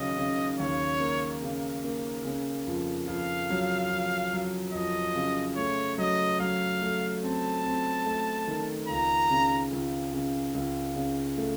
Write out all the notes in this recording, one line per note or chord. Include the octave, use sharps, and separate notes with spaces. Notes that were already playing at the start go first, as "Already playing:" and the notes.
Already playing: D#2 C#3 F#3 D#5
C#3
D#2 C#5
A#3
C#3
A#3
C#3
F2
F2 F5
F#3
F2
F#3
F2 D#5
C#3
A3 C#5
F#3 D#5
F#3 F5
A3
C4 A5
C4
A3
D#3
C#2 A#5
C#3
C#2
C#3
C#2
C#3
A3